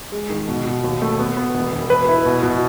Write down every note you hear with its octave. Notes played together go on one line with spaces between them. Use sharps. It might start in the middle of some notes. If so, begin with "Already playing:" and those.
G#3
D#3
B2
B2
D#2
A3
B3
B3
E1
E1
B4
E4
B2
B2